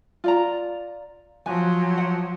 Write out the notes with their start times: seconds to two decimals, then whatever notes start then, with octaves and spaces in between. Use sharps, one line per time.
0.24 F4 D5 A#5
1.46 F3 F#3 G#5
1.98 F#5